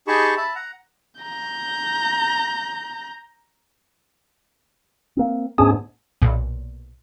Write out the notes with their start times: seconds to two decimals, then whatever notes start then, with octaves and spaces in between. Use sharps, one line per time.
0.07 D#4 G4 G#4 A5 B5 C#6
0.37 E5 A5 B5
0.55 F#5 A#5
1.21 A#5 G6
5.17 A#3 C4
5.58 D2 G#2 B3 C#4 D4 G#4
6.22 B1 A#2